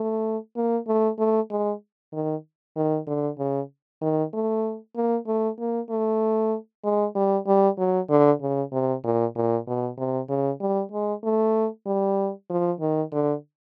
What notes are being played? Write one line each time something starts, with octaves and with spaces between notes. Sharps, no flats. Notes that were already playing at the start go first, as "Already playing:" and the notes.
Already playing: A3
A#3
A3
A3
G#3
D#3
D#3
D3
C#3
D#3
A3
A#3
A3
A#3
A3
G#3
G3
G3
F#3
D3
C#3
C3
A#2
A#2
B2
C3
C#3
G3
G#3
A3
G3
F3
D#3
D3